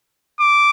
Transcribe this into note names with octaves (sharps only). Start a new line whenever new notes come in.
D6